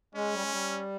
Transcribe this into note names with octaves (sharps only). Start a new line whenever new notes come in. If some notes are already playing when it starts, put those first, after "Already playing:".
G#3 C#4
G3
G#3
G3